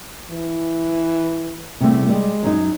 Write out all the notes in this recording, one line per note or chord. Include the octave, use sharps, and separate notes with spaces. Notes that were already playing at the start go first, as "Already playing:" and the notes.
E3
E2 C3 G3 A3
G3 G#3
F#2 F#3 D#4